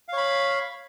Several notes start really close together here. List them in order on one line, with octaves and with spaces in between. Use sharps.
F5 C#5 B5